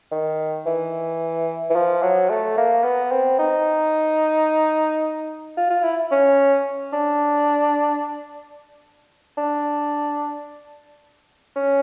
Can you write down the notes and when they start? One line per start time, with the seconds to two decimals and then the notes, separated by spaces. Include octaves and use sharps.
0.12 D#3
0.66 E3
1.70 E3
1.75 F3
2.02 F#3
2.30 A3
2.57 A#3
2.84 B3
3.11 C4
3.39 D#4
5.57 F4
5.70 F4
5.83 E4
6.11 C#4
6.93 D4
9.37 D4
11.56 C#4